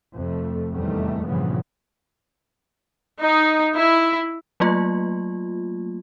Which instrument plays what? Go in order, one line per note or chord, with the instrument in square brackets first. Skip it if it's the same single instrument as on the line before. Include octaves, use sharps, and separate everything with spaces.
[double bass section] F2 C3 A3
E2 A2 C3 D#3 G3 A3
G2 A#2 C#3 E3 F3 B3
[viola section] D#4
E4
[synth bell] F#3 A3 A#3 F4